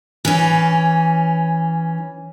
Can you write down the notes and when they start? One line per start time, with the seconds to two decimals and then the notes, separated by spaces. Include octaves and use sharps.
0.25 E3 C#4